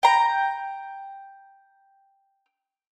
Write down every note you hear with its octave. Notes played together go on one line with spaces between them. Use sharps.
G5 A#5